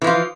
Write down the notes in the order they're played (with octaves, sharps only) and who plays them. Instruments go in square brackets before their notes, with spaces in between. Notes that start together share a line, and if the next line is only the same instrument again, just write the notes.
[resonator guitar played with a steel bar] E3
F3
F4